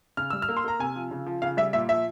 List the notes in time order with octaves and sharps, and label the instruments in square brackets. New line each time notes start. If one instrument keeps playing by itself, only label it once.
[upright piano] C#3 F6
G3 E6
F6
A#3
C6
A#3 A#5
C3 G#5
F3
C#3
F3
C#3 F5
G3 E5
A#2 E5
F3 E5